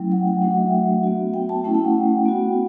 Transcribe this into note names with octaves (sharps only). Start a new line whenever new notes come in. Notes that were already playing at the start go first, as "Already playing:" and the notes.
Already playing: F#3 A3 C#4 E4 G5
F#5
G5
F#3 A3 D4 F#4 F#5
E5
B3 F#4
G5
A5
A3 C#4 E4 G5
G5
F#5
B3 F#4